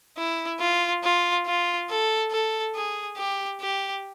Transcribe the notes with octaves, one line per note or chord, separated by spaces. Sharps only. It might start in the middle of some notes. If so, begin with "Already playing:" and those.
E4
F4
F4
F4
A4
A4
G#4
G4
G4